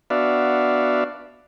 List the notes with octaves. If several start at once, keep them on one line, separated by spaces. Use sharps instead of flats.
B3 D4 F#4 D5 E5 F5